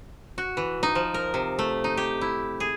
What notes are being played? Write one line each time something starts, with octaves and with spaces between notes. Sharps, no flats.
F#4
E3
D#4
F3
A#4
C3
A3
D#4
G4
E4
G#4